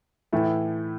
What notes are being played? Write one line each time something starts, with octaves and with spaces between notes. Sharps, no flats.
A2 E3 A3 E4